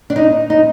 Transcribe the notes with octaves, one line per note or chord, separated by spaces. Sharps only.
D4
D#4
D#4